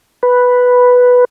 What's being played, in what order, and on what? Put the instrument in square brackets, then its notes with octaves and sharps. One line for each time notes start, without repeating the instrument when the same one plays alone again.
[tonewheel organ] B4